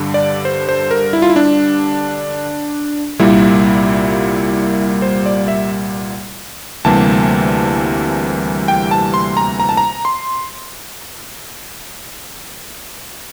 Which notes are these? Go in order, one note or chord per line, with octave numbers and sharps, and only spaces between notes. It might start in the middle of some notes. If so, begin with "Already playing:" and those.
Already playing: G2 D3 G3
D5
C5
C5
A#4
E4
F4
E4
D4
C2 A#2 G3 A#3 E4
C5
D5
E5
D2 C3 E3 G3 A#3 A5
G5
A5
C6
A#5
A#5
A5
A#5
C6